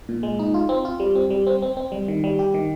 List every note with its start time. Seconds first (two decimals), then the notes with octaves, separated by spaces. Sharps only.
0.09 A#2
0.23 G#3
0.39 D#4
0.54 F4
0.69 C4
0.85 F4
1.00 G3
1.15 C4
1.30 G3
1.47 C4
1.62 C4
1.77 C4
1.92 G3
2.08 D#3
2.24 G3
2.39 G4
2.54 D#3